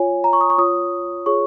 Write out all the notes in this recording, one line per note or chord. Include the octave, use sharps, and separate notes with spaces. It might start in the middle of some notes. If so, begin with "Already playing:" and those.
Already playing: F4 C#5 G#5
A#5
C#6
D#6
C#6
F4 C#5 D#6
F4 G#4 C#5 C#6